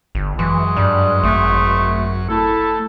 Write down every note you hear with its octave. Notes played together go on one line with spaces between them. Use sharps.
G1
F#2 E3 G#3 C#6
G2 G3
G#1 A3
A3 E4 A4